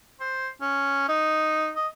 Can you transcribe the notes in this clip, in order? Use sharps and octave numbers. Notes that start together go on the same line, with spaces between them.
C5
C#4
D#4
D#5